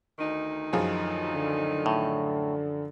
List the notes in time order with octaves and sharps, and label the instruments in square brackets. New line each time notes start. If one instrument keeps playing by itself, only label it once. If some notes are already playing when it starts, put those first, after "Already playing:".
[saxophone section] D2 D#3 D#4
[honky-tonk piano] F#2 F3 G#4
[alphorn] D3
[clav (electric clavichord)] A2